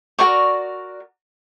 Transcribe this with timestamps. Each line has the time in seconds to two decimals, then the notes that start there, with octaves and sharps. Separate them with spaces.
0.19 F#4 A#4 D5 C#6